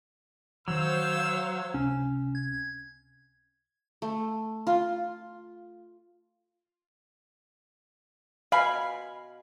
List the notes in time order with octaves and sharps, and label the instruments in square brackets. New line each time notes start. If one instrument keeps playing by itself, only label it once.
[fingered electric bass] D#3 E3 [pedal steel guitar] F#3 [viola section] C5 C#5 F5 [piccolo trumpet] E6
[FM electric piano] C#2 C3 [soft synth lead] C#4
[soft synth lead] G#6
[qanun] A3
F4
[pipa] B2 G#5 B5 [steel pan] F5